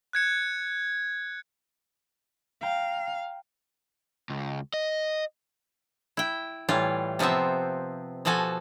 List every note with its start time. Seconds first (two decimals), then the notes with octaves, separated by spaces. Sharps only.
0.13 F#6 G#6 C#7
2.63 F5 G5 A#5
4.29 C#2
4.74 D#5
6.17 E4 G5
6.69 A2 E3 G3 F4
7.19 C3 F3 B3 C4 E5
8.25 B2 F3 F#4 A4 G#5